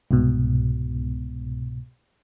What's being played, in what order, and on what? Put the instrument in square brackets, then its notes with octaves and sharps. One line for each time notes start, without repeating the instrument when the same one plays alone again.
[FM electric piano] C2 G#2 B2